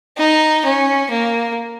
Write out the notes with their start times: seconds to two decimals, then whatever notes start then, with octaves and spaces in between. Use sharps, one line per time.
0.18 D#4
0.65 C#4
1.11 A#3